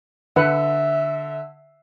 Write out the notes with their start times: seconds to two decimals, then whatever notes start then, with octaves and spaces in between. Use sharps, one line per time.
0.36 D3 B4 E5 F#5